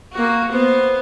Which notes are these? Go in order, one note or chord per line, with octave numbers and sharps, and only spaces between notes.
A#3 F#4
B3 C5